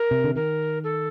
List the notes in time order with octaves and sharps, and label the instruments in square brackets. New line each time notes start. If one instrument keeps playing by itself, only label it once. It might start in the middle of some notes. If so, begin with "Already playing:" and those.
Already playing: [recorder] A#4
[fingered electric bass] C3
D3
[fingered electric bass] D#3 [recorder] A#4
[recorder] A4